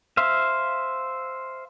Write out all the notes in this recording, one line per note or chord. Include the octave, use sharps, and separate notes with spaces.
C5 E5 F5